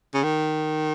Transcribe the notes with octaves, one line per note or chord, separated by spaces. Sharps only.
C#3
D#3